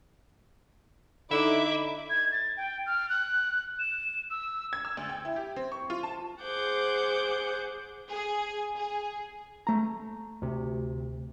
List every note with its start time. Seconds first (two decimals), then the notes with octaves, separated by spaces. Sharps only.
1.31 D3 D#4 E4 E5 B5 D6
2.10 G#6
2.32 A6
2.57 G5
2.86 F6
3.09 F#6
3.80 E7
4.31 E6
4.73 G#6
4.85 E6
4.97 D2
5.09 G5
5.25 E4
5.36 G4
5.56 C4
5.72 C#6
5.90 F4
6.03 A5
6.42 G#4 C5 F#5 D6 G6
8.10 G#4
8.76 G#4
9.67 A3 A#5
10.42 D2 C3